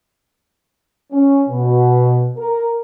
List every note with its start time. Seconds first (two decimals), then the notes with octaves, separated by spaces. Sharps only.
1.11 C#4
1.48 B2
2.37 A#4